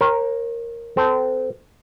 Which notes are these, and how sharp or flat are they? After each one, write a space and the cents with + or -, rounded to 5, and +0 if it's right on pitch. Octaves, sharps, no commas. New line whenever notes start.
A#4 +0 C#5 -40 G5 +0
C4 -25 A4 +0